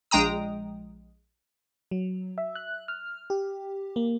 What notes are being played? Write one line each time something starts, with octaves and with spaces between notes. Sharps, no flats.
A#1 G#3 G5 A#5 D#6
F#3
E5
F#6
F6
G4
A#3